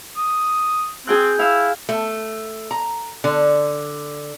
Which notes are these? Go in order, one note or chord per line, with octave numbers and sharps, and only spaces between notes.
D#6
C4 G#4 G5 F#6
E4 F5 E6
A3
A#5
D3